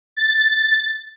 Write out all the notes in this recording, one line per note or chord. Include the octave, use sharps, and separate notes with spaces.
A6